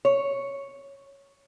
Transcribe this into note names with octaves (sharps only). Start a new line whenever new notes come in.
C#5